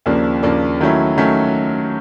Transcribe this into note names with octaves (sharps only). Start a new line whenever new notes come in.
D#2 C#3 F3 A#3 D4
D#2 C#3 F3 A#3 D4
D#3 F#3 A3 C#4 E4
D#3 F#3 A3 C#4 E4